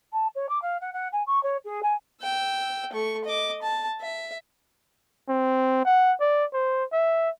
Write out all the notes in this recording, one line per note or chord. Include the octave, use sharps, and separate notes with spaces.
A5
C#5
D6
F5
F#5
F#5
G#5
C#6
C#5
G#4
G#5
G5 E6
A3 C#6
D#5 D6
A5
E5
C4
F#5
D5
C5
E5